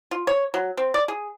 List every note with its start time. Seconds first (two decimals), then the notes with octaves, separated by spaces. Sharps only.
0.11 F4
0.27 C#5
0.54 F#3
0.77 C4
0.94 D5
1.08 G#4